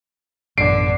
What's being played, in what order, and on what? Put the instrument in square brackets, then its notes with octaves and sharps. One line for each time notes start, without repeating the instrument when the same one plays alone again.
[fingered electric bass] A1 F#2 B2 [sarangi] D3 [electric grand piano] C7 D7